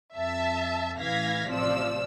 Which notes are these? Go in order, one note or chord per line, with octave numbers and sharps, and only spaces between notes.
F2 E5 A5
A1 E3 F5 G#6 A#6 B6
A1 C3 F3 D5 E6